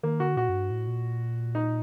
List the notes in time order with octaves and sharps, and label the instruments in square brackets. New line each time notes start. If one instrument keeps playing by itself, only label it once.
[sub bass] D#3 [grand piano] A#3
[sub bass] D3 [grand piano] F#4
[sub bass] A#2 [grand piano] F#4
[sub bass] F#2
G2
A2
A#2
[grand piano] D#4